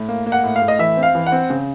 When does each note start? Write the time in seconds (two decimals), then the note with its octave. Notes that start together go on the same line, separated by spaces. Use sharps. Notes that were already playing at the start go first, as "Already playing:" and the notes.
Already playing: A2
0.09 A#3
0.26 A#3
0.32 F#5
0.44 A2
0.56 F5
0.62 A2
0.68 D#5
0.79 E3 E5
0.97 C4
1.03 F5
1.15 E3
1.26 F#5
1.32 C4
1.50 C#3